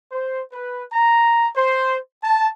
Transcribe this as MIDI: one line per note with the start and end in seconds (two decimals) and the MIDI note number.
0.12 0.41 72
0.53 0.83 71
0.92 1.47 82
1.56 1.97 72
2.23 2.48 81